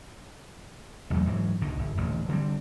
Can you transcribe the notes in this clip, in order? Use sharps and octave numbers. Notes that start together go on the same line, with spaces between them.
A1 E2 F#3 A3
G#2 E3 F#3
C#2 B2 D3 D#3
G1
D#1 A1 D3
D3 G3 C4